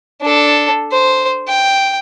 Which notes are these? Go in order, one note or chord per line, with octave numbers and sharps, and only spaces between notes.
D4 A4
C5
G5